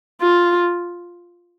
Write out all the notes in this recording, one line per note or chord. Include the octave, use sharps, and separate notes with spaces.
F4